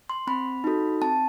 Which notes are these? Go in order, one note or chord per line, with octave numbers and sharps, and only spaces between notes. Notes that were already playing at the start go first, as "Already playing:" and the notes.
C6
C4 B5
D#4 F#4 A4
C4 A5